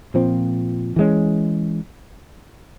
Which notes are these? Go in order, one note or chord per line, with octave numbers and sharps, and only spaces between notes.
A#2 F3 C4
E3 G#3 C#4